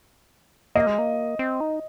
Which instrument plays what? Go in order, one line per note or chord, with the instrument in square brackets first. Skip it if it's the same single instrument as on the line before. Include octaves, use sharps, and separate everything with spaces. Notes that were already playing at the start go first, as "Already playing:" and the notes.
[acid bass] A#3 [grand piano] D#5
[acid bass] G#3
A#3
C4
D#4